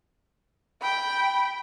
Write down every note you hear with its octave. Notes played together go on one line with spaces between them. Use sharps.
G5 B5